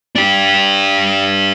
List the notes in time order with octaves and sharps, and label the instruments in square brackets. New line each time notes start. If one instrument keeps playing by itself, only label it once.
[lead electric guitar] D4 G4